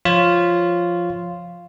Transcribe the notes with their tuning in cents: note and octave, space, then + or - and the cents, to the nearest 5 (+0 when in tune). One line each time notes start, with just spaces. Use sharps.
F3 +0 F4 -5 C#5 +0